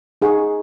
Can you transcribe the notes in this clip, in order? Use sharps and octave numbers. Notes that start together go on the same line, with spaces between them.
D#4 G#4 F#5 C#6